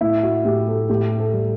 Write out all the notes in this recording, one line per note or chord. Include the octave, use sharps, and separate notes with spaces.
A2 E4
F#4
A2 G4
A4
A2 G4
A4
G3